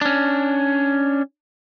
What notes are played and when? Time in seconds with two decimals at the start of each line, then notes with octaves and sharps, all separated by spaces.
0.01 C#4 D4